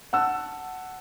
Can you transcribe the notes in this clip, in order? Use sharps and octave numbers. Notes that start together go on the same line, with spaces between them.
F#5 A5 E6